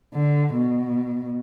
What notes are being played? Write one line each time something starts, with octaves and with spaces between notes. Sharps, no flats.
D3
B2